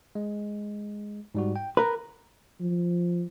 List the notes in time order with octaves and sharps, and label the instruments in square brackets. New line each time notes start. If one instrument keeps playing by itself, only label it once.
[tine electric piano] G#3
G#2 G3 F#4
G5
[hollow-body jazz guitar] A#4 B4 [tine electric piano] A#5
[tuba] F3